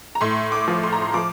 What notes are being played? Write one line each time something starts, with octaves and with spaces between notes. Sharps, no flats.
A#5
A2 C6
D6
F3
C6
A#5
C6
F3 D6